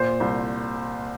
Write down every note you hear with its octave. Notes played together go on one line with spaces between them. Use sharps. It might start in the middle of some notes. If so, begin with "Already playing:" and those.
Already playing: A#2 C5
C2